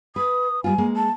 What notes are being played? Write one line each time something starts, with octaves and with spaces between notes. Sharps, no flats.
B4 D#6
G3 C4 F4 G#5
G#3 A#3
A5